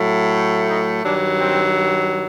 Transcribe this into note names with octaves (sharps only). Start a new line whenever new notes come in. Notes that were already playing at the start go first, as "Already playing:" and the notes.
Already playing: A2 F#3 A3
D#4
G2 D#3 F#3 D4
C4